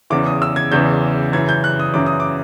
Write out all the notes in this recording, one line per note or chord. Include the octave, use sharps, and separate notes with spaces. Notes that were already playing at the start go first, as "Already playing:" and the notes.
E2 C#3 E3 D6
D#6
E6
G#6
E2 C#3 E3 G6
F#2 C#3 E3 G#6
G6
F#6
D#6
F#2 C#3 E3 D6
D#6
D6